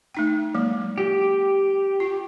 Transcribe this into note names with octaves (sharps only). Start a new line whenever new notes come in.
A3 D#4 G5
F#3 G#3 A#3
G4
F4